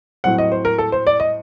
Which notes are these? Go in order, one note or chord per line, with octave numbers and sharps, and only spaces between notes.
A2 F#3 C4 F#5
D#5
C5
A#4
A4
C5
D5
D#5